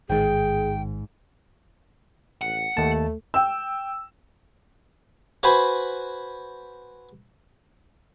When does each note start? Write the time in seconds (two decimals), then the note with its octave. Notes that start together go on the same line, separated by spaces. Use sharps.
0.09 A1 G#2 D#3 G#3 G#4 G5
2.41 A1 F#5
2.77 D#2 A3 A5
3.34 G5 E6
5.43 F#4 B4 C5 G#5 B5